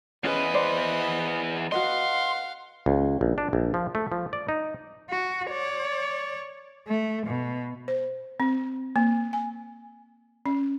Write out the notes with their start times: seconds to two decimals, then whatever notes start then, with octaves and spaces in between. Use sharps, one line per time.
0.24 E2 C#4 G#4 B4 C5 D#5 B5
0.54 C5 D5
1.72 F#4 B4 D#5 F5 F#5 C6
2.86 C#2
3.21 A#1
3.38 D4
3.53 A#1
3.74 F3
3.95 A3
4.12 F3
4.33 D5
4.49 D#4
5.10 F#4
5.49 C#5 D5
6.87 A3
7.27 B2
7.88 C5
8.40 C4
8.96 A#3
9.33 G#5
10.46 C#4